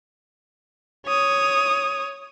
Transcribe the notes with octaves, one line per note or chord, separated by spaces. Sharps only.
C#5 D#6